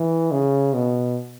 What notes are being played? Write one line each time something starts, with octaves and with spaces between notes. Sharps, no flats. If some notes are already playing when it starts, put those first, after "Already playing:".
Already playing: E3
C#3
B2